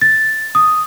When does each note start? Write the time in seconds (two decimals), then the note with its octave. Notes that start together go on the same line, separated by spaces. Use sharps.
0.02 A6
0.55 D#6